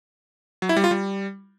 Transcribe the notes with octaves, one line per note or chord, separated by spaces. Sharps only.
F#3
E4
G3
F4
G3